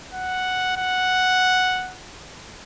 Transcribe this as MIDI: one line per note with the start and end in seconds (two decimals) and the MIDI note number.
0.14 0.74 78
0.77 1.97 78